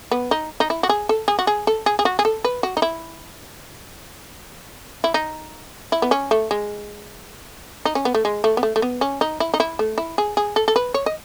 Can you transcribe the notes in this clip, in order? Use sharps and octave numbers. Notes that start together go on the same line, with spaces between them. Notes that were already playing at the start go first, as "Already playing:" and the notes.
B3
D#4
D#4
E4
F#4
G#4
A4
G#4
F#4
G#4
A4
G#4
G#4
F#4
G#4
A4
B4
F#4
D#4
E4
E4
D#4
E4
B3
C#4
A3
G#3
D#4
C#4
B3
A3
G#3
A3
B3
A3
A3
B3
C#4
D#4
E4
D#4
E4
A3
E4
G#4
G#4
A4
A4
B4
C#5
D#5